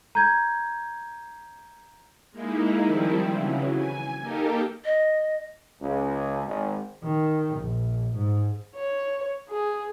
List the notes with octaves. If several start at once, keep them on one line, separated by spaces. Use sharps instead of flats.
A#5 G6 G#6
G#3 A#3 D#4 E4
D#3 F3 G3 C4 E4
C#3 E3 F#3
G#5
A#3 D#4 G4 A4 A#4
D#5
C#2
G#1
D#3
A#1
G#2
C#5
G#4